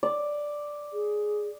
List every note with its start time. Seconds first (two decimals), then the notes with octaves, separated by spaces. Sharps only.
0.03 D5
0.93 G#4